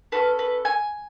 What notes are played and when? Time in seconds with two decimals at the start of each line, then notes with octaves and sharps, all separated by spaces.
0.12 C#4 F#4 A4 B4
0.39 B4
0.65 G#5